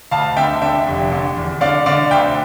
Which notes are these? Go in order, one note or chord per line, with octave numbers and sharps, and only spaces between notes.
D2 F5 A5
D3 E5 G5
D3 E5 G5
F1
D3
E2
D3 D5 F5
D3 D5 F5
D2 E5 G5